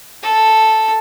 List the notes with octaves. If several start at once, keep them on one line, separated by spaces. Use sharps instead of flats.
A4